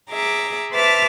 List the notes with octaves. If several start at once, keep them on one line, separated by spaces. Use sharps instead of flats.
G#4 E5 A#5 D6
B4 C5 E5 A5 D6 F6